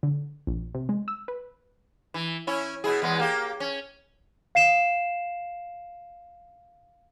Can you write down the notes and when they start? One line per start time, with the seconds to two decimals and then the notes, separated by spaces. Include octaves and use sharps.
0.03 D3
0.47 A#1
0.75 C3
0.89 G#3
1.08 E6
1.28 B4
2.14 E3
2.47 C#4 E4
2.84 B2 E4 G#4
3.02 E2 G#3 B3
3.20 A#3 G4
3.60 C#4
4.55 F5 C7 E7